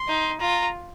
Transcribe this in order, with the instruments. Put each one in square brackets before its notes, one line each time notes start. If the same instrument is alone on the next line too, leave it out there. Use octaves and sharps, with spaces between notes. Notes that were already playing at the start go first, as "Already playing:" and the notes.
Already playing: [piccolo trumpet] C6
[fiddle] D#4
[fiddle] F4 [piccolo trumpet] A#5